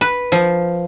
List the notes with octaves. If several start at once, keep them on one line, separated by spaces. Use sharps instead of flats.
B4
F3